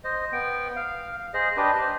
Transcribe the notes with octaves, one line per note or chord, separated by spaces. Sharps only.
C5 D#5
B3 G5
F5
G#4 C5 D#5
D4 G4 B4 D#5
C5